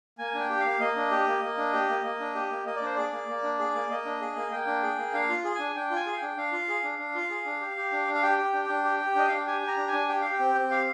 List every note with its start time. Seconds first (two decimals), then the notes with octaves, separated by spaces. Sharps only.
0.18 A#3 G#5
0.34 D4
0.40 G5
0.49 G4
0.60 A#3 F5
0.80 A#3 D#5
0.96 D4
1.11 G4
1.27 A#3
1.42 A#3
1.58 D4
1.73 G4
1.89 A#3
2.04 A#3
2.20 D4
2.35 G4
2.51 A#3
2.66 A#3 D#5
2.76 D5
2.82 D4 C5
2.96 G#4 D5
3.12 A#3
3.28 A#3
3.43 D4
3.59 G#4
3.75 A#3
3.90 A#3 D#5
4.05 D4
4.21 G#4
4.36 A#3
4.52 A#3 G5
4.67 D4
4.83 G#4
4.98 A#3
5.14 D4 F5
5.29 F4
5.44 G#4
5.55 D4 G#5
5.76 D4 G5
5.91 F4
5.96 G#5
6.06 G#4
6.12 F5
6.16 G5
6.22 D4
6.37 D4 F5
6.52 F4
6.69 G#4
6.84 D4
6.99 D4
7.15 F4
7.30 G#4
7.45 D4
7.61 G4
7.77 G4
7.92 D4
8.08 D4
8.15 F5
8.23 G4 G5
8.38 G4
8.53 D4
8.69 D4
8.85 G4
9.00 G4
9.15 D4 D#5
9.28 D4 F5
9.37 G5
9.46 G4 G#5
9.62 G4
9.67 A#5
9.77 D4
9.87 G#5
9.93 D4
10.09 G4 G5
10.21 G4 F5
10.33 G5
10.39 C4
10.55 C4
10.70 G4 F5